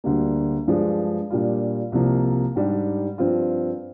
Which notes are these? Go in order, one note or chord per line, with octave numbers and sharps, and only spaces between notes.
D2 D3 G3 A#3
G2 F3 G#3 D4
A#2 G3 D4 F4
C2 C3 F3 A#3
G#2 G3 D4 G4
G2 F3 C4 F4